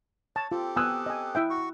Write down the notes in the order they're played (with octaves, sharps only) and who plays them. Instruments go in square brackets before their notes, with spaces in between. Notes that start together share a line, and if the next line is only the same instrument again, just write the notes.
[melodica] C#5 [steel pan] A5
[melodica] C4 G4 A4 [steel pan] F4
[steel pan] B3 G#5 [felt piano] D#6 E6 F#6
[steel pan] D#5 G#5
E4 E5 G5
[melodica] F#4 C#6